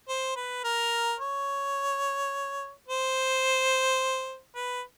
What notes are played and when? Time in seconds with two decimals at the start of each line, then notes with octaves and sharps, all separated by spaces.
0.08 C5
0.36 B4
0.64 A#4
1.20 C#5
2.88 C5
4.56 B4